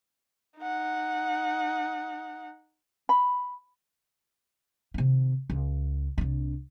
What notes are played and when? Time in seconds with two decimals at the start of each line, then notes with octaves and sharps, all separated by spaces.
0.59 D#4 F#5
3.09 B5
4.94 C3 D#3
5.50 C#2
6.18 C2 D4